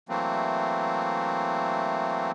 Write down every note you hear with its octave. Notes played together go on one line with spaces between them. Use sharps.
E3 F#3 A3 A#3 C4